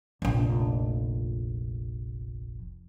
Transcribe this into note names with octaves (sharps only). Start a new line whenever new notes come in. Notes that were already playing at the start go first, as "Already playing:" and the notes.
F1 A#1